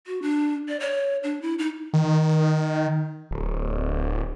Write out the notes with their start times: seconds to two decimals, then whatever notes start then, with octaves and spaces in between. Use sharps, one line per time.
0.07 F#4
0.22 D4
0.68 D5
0.80 C#5
1.23 D4
1.42 E4
1.59 D#4
1.94 D#3
3.31 D1